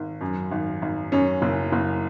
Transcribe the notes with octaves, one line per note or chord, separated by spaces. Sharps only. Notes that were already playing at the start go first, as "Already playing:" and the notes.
Already playing: G#1
F#2
G#1
G#1
F#2 C#4
F#1
F#1